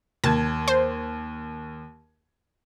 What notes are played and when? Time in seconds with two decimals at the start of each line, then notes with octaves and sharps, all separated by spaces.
0.24 D#2 A5 G#6
0.68 C5